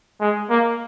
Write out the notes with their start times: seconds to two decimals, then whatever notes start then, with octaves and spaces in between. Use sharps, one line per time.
0.21 G#3
0.50 A#3